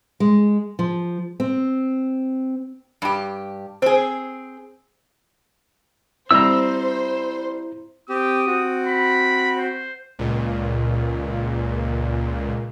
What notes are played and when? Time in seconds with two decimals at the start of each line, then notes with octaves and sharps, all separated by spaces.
0.20 G#3
0.79 F3
1.40 C4
3.02 G2 G4
3.82 C4 G#4 C5
6.31 G3 C4 E4 C5 E5 A#5 E6
8.09 C4 G4 D#6
8.47 C4 F#4
8.87 B5
9.58 C5
10.19 C#2 A#2